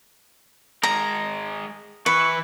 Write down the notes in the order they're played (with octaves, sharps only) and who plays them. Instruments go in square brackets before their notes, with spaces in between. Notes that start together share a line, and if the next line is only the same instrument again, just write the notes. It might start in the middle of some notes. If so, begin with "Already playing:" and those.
[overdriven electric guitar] G#3 A#4 [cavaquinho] A#5
[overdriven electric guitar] E3 [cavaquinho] B4 [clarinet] C#6